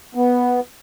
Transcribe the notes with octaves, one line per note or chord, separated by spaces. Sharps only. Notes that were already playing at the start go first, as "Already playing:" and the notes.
B3